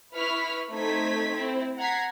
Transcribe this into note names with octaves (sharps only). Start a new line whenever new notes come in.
E4 B4 B5 C#6 F6 B6
A3 C4 D#4 C5 G#6 B6
C4 E4
F#5 A#5 G#6 B6 C7